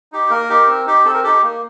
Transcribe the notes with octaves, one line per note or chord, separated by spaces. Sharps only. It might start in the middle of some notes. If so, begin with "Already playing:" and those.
D#4 G4
A#3 A#4
D#4 G4
C4
D#4 G4
C4 A4
A#4
D#4 G4 A4
A#3